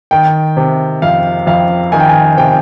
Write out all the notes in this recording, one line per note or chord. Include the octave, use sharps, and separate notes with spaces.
D#3 G5
C3
F2 F5
F2 F5
D#3 G#5
G5
G#5
C3 G5